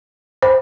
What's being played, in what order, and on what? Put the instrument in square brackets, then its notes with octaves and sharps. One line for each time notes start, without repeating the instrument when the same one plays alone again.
[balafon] C5